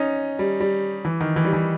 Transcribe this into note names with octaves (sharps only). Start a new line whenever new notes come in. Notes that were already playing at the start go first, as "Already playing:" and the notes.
Already playing: C#4 D#4
G3
G3
E3
D#3
E3
G3
E3